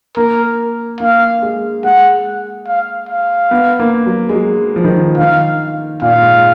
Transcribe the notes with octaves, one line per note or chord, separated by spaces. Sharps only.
A#3 A#4
A#3 F5
G#3
G#3 F#5
F5
F5
B3
A#3
F#3
G#3
F#3
F3
D#3
F3
D#3 F5
A#2 F5
A#2
G#2